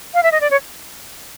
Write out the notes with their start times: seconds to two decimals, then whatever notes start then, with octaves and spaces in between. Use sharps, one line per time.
0.14 F5
0.23 E5
0.32 D#5
0.41 D5
0.50 C#5